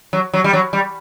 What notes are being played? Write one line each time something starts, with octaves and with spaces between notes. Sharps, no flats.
F#3
F#3
G3
F#3
G3